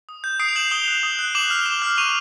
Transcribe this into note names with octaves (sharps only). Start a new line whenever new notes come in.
D#6
G6
D#6 C7 D7
F7
G6 E7 F#7
D#6 F7 G7
F#6
D#6
F#6
D6 E7 F#7
F6
D6
F6
C#6 D#7 F7